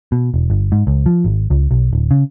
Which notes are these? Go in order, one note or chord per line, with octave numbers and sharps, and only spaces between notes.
B2
E1
G1
G#2
C#2
F3
G#1
C#2
B1
D1
C#3